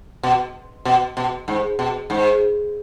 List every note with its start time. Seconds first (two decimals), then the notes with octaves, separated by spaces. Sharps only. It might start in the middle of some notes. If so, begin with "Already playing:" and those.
0.23 B2
0.85 B2
1.17 B2
1.48 G#2
1.79 B2
2.10 G#2